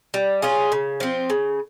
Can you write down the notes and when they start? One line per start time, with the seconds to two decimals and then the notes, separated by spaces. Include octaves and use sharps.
0.14 G3
0.42 C#4 F4 G#4
0.72 C#3
1.00 F3 C4
1.30 C#3